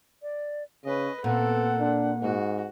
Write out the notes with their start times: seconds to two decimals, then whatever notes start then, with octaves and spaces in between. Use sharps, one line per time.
0.22 D5
0.84 C#3 C#4 B4 D#5
1.24 A#2 B3 C4 A4 F#5
1.79 D4
2.22 G#2 F#4